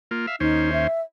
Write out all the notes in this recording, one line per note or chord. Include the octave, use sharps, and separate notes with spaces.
A#3 F4
E5 F5
D#2 C#4 D#4 C5
E5